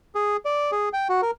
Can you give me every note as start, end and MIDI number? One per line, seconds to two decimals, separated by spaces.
0.15 0.37 68
0.45 0.71 74
0.72 0.89 68
0.93 1.08 79
1.09 1.21 66
1.22 1.31 70